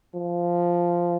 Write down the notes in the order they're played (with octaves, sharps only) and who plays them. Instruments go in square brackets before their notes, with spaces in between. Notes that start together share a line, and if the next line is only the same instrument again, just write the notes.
[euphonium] F3